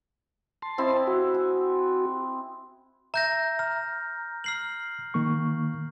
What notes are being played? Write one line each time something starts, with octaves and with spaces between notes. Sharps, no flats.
A5 C6
C4 E4 D#5
F#4
G#5
E5 A#5 G6 A#6
A#5 F6
F6 C7 F#7
D#3 A#3 C#6